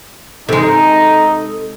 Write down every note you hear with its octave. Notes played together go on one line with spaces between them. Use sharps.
C3 G#3 D#4 A4